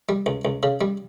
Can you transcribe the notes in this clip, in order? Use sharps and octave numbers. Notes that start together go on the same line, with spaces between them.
G3
C#2
C#2
C#3
G3